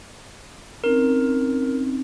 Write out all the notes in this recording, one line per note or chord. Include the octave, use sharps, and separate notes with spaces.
C4 C#4 D#4 A#4